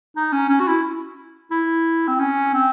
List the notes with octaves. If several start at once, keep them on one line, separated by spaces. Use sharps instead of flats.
D#4
C#4
C#4
F#4
E4
E4
C4
C#4
C4